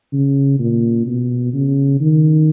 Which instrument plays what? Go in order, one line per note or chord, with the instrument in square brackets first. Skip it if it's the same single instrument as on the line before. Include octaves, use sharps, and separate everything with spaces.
[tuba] C#3
A#2
B2
C#3
D#3